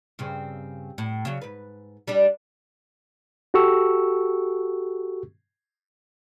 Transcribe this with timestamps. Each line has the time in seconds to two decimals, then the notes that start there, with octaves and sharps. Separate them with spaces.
0.19 G2 C#3 C4
0.98 A2
1.25 C#3 F#3
1.42 G#2 B4
2.08 G3 D4 G4
3.54 F#4 G4 A4 C#6 E6